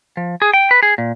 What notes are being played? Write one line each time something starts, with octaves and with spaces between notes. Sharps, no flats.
F3
G#4
G5
B4
G#4
A#2